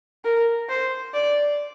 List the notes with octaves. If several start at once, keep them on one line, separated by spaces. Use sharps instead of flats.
A#4
C5
D5